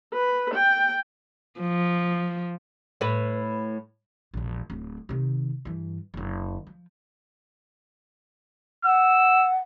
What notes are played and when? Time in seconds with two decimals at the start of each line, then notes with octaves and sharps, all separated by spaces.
0.13 B4
0.54 G5
1.60 F3
3.01 A2 B4
4.34 E1 A#1
4.70 D1 C4
5.09 C3 D#3
5.65 G2 E3
6.14 F#1 D3
6.67 F3
8.85 F#5 E6